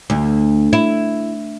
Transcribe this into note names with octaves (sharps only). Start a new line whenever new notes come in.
D2
E4